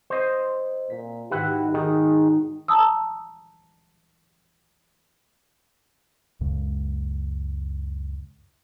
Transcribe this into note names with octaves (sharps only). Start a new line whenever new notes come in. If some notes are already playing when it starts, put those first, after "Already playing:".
C4 C5 D#5
A#2 B6
G#2 D#3 E4 F#4 G4 B4 F#5
D#3 D#4 G#4
A5 A#5 D#6 E6
C#2 F#2 C#3 G#3